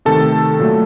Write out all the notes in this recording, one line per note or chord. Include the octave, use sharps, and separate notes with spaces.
C3 D#3 A3 A4 A5
A#2 F#3 A3